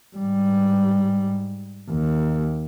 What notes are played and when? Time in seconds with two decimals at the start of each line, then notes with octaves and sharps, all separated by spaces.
0.17 G#2 G3
1.90 D#2